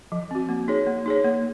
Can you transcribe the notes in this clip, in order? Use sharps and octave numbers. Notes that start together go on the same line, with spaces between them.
F3
C4 F#4
A#3
D#4 G#4 C#5
A#3
D#4 G#4 C#5
A#3